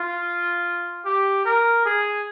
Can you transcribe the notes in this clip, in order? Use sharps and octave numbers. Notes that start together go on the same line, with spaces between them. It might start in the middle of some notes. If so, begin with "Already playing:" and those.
Already playing: F4
G4
A#4
G#4